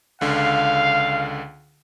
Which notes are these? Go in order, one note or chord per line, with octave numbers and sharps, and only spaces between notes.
C#2 D3 F5